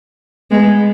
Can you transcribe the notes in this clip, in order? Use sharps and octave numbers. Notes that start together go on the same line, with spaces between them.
G#3 B3